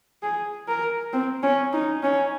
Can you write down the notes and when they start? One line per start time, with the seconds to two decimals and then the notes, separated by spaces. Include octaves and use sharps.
0.23 G#4
0.68 A#4
1.13 C4
1.43 C#4
1.73 D#4
2.03 C#4